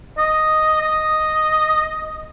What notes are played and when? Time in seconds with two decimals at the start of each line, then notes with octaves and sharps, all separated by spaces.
0.18 D#5
0.81 D#5